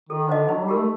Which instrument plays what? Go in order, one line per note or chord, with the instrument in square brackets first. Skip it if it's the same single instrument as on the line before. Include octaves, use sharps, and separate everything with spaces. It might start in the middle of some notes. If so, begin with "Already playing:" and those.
[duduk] D#3 [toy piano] A4
[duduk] D3 [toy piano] C5 D#5
[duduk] F#3 [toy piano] D#4
[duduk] G3
[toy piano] G4 A#4
[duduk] A3